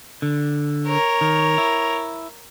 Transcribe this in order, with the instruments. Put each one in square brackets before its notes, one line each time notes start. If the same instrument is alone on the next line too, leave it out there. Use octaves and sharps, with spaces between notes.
[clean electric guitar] D3
[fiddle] A#4 C#5
[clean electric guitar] D#3
E4